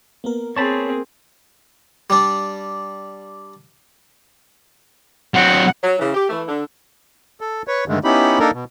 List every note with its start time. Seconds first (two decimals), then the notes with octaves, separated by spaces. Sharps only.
0.24 A#3 B3 A#4
0.56 C4 G#4 C#5 A5 B5
2.10 G3 D4
5.34 F#3 C4 F#5
5.84 F#3
5.99 C#3 E3
6.14 G4
6.29 E3 A3
6.48 D3
7.41 A4
7.67 B4 C#5
7.88 G2 D3 D#3 G#3 A3
8.04 B3 C#4 D#4 E4 G4 B5
8.39 A#3 D4 D#4 A4 A#4
8.53 B2